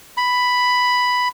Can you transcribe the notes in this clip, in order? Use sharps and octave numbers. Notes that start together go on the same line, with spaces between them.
B5